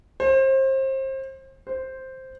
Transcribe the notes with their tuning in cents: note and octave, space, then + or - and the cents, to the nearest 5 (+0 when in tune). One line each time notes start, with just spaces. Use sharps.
C5 +30
C5 +0